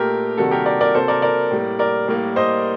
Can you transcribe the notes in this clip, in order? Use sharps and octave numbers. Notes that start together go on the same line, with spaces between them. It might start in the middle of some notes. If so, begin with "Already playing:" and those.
Already playing: A#2 A3 G4 A#4
C3 D#3 G3 A#3 F#4 A4
G4 A#4
A#4 D5
A#4 D5
C3 F#3 A#3 A4 C5
A#4 D5
A#4 D5
A2 G3 A#3
A#4 D5
A2 G3 A#3
C5 D#5